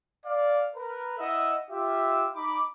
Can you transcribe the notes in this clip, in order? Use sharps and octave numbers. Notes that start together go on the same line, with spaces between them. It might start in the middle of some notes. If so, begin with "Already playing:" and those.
D5 F5
A#4 B4
E4 D#5 E5 F#5
F4 G4 E5
D#4 B5 D6